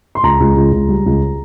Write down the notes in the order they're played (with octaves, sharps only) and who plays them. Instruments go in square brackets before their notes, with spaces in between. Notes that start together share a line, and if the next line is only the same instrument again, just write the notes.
[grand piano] C6
C#2 A#5
C#2
C#2
C#2
G3
C#2